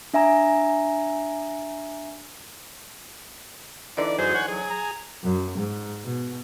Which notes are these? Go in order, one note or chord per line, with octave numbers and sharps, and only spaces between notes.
D4 E5 G#5 A#5
D3 E3 D#4 D5
F#2 G#4 C5
C#5 F#5 G#5
F#3 G#4
A#5
F#2
G#2
B2